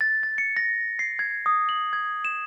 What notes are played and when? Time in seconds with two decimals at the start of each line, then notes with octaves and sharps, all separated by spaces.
0.01 A6
0.23 A6
0.38 C#7
0.57 A#6
0.99 C7
1.19 G#6
1.46 D#6
1.69 F#7
1.93 G#6
2.25 E7